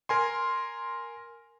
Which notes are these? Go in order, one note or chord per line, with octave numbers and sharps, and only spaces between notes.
A#4 G#5 C6